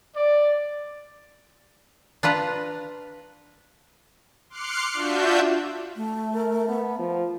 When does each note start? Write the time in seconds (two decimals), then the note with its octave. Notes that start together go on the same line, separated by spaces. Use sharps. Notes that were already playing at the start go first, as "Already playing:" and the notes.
0.16 D5
2.23 D4 F4 B4 A#5
4.50 C6 D6 F6 F#6 C7 C#7
4.93 D4 F4 F#4 E5 G6
5.96 A3
6.34 A#4
6.68 B3
6.99 F3